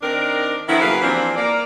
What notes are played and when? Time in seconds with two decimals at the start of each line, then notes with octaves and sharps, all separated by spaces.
0.01 D#3 C4 D4 D#4 A#4
0.68 D3 D#3 F3 B3 E4
0.80 C#3 F#3 A#3 B4 F5
1.01 E3 F3 G3 A#3 C4 D4
1.36 A#3 A#4 D5